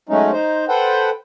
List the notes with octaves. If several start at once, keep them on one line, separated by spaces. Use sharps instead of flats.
F#3 G#3 A3 C#4 D#4
D#4 C5
A4 B4 C5 F#5 G5